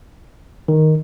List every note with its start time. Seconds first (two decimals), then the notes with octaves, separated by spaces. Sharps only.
0.68 D#3